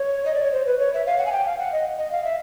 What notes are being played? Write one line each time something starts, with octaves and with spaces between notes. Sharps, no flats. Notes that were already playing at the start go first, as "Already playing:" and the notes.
Already playing: C#5
D#5
D5
C#5
C5
B4
C#5
E5
F5
F#5
G#5
G5
F5
F#5
D#5
D#5
F5
E5